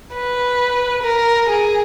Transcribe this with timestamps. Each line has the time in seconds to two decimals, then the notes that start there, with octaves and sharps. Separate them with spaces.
0.13 B4
1.03 A#4
1.49 G#4